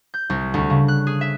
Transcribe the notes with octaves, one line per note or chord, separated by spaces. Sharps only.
G6
C2
D2
C#3
F#6
G#4
E5